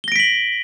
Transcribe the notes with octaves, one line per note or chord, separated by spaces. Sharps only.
A#6 B6 D7 F#7 G7